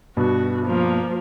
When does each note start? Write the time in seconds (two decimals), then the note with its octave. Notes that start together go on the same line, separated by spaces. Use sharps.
0.17 G2 B2 F#4
0.67 F3 A#3